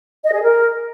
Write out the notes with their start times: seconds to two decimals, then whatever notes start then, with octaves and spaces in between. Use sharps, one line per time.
0.23 D#5
0.33 G#4
0.42 A#4